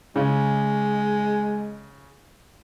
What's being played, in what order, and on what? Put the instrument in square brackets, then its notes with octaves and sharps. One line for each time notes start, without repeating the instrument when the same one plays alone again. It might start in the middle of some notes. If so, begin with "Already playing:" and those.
[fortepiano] C#3 [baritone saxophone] G#3